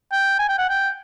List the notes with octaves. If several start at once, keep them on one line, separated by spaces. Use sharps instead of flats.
G5
G#5
G5
F#5
G5